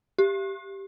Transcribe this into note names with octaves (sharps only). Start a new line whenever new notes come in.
G4